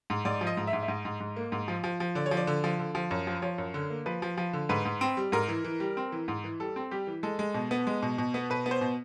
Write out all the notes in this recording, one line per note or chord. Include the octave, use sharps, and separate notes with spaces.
G#2
G#2 D5
F3
D#5
G#2
E5
G#2
E5
G#2 D#5
G#2
G#2
A#3
G#2
F3
F3
F3
D3 D5
C#5
F3
D5
D3
F3
D3
F3
F#2
F3
F3 C#5
F#2
D3
A#3
F3 B4
F3
F3
D3
G#2 B4
G#2
C4
G3
G#2 A#4
E3
E3
G3
C4
E3
G#2
E3
G3 A4
C4
G3 G4
E3
G#3 A4
G#3
B2
B3
G#3
B2
B2
B3
B2 B4
B3
C5
B2